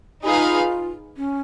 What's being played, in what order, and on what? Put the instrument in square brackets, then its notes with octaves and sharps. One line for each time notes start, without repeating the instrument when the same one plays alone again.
[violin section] D#4 G#4 B4 F5 [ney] F4 G4
[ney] C#4